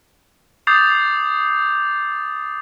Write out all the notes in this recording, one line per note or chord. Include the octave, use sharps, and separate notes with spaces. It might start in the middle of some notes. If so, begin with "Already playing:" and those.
D6 D#6 G6 A6 C7 F7